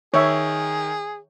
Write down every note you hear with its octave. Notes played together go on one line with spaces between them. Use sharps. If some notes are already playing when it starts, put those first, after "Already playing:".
D#3 G#4 C#5 E5